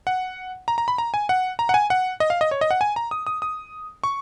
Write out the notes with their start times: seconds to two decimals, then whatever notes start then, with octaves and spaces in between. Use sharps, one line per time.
0.07 F#5
0.68 A#5
0.78 A#5
0.88 B5
0.98 A#5
1.14 G#5
1.29 F#5
1.59 A#5
1.69 F#5
1.74 G#5
1.90 F#5
2.20 D#5
2.30 F5
2.41 D#5
2.51 C#5
2.61 D#5
2.71 F#5
2.81 G#5
2.96 A#5
3.11 D#6
3.27 D#6
3.42 D#6
4.04 C#6